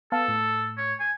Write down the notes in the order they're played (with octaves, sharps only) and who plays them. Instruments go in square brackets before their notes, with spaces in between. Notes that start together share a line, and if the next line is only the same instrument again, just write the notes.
[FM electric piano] B3 F5 A5 [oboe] A4
[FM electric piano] A2
[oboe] C#5
G#5